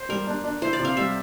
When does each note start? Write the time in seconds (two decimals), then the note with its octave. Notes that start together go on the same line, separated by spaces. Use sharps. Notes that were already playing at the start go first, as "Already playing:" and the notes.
Already playing: C5
0.09 G3 A#4
0.27 D4
0.44 D4
0.62 E4 C5
0.73 D5
0.79 C3
0.85 F5
0.97 G3 E5